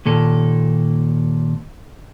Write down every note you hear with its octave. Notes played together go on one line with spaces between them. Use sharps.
D#2 A#2 A4